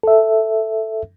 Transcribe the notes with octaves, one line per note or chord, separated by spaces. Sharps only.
A4 E5